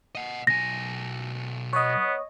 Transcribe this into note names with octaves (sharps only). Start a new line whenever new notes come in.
D#5 F#5
B1 G#5 A#6
B3 C#5 D#5